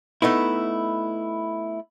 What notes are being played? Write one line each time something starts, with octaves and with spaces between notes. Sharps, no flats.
A3 B3 D#4 E4